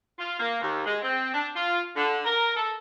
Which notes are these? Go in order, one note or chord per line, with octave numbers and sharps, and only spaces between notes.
F4
A#3
D#2
G#3
C4
D4
F4
D3
A#4
A4